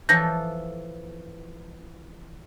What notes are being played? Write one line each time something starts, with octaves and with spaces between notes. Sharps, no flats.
E3 F3 A4 G6 A#6